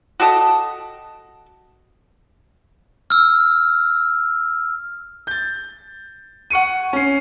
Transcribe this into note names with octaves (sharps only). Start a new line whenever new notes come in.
F#4 G4 A4 D#5
E6 F6
G6 A6
F#5 C#6 C#7 D#7
C#4 C7